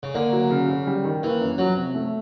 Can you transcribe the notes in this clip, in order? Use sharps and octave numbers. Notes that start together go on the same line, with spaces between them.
C#3
D3 A#3
F#3
C#3
C#3
G3
D#3
E3 A#3
F#2
F3 F#3
C3
A3